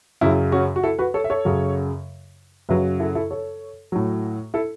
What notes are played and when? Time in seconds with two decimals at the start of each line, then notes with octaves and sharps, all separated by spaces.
0.21 F#2 C#3 F#3 E4
0.52 C#4 F#4
0.76 F#4
0.83 E4 A4
0.99 F#4 B4
1.14 A4 C#5
1.24 E5
1.30 A4 C#5
1.45 F#2 C#3 F#3
2.69 F#2 C#3 F#3 B4 E5
3.00 E4 A4
3.15 E4 A4
3.31 A4 C#5
3.92 A2 F#3
4.54 E4 A4